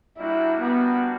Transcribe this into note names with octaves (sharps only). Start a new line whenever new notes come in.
G3 A#3 D4 E4 F#4
B3